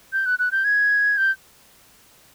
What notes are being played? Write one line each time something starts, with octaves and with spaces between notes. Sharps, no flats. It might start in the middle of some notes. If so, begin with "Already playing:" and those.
G6
F#6
F#6
G6
G#6
G6